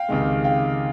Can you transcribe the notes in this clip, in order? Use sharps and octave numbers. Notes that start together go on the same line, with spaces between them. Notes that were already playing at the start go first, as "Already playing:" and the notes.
Already playing: F5 G5
C#2 C3 D#3 G#3
F5 G5